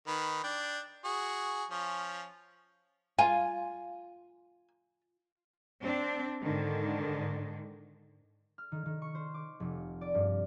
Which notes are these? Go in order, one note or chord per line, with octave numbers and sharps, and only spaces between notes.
D#3 B4
D4 G5
F#4 G#4
F3 C#4
F4 G#5
C4 D4
G#2 D3 D#3
F6
D#3
D#3
C#6
C5
D6
F1
D5
G2